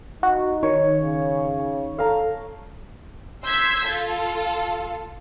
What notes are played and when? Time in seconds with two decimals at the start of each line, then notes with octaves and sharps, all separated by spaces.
0.23 D#4 F#4
0.63 D#3 C#5
1.01 C#3
1.99 A4 F5 A#5
3.44 C6 E6 G6 G#6 B6
3.88 F4 A4